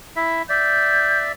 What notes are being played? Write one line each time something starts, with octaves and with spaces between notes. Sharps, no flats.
E4 E5
D5 E5 G6